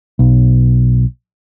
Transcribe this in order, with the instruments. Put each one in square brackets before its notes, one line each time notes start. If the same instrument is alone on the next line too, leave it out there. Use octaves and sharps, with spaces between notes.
[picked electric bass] B1